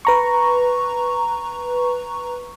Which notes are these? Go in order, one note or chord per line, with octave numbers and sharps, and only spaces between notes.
B4 A#5 C#6